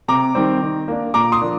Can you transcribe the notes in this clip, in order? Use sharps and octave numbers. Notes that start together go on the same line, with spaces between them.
C3 A#5 D6
D#3 G3 C4
D#3
A#3 D4
A#2 A#5 D6
C6 D#6
F3 A#3 D4